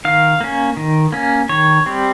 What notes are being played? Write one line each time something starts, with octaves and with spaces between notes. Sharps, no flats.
D#3 F5
A#3 C#4
D#3
A#3 C#4
D#3 C#5
G3 C4